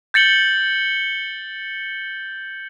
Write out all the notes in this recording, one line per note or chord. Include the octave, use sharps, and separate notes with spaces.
G6 A6 C#7 F#7 G7